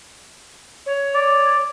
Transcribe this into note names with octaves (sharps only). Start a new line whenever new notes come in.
C#5
D5